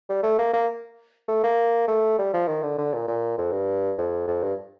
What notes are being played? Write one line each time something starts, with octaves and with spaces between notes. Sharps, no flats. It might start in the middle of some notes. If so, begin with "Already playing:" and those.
G3
A3
A#3
A#3
A3
A#3
A3
G3
F3
D#3
D3
D3
A#2
A#2
F2
G2
F2
F2
G2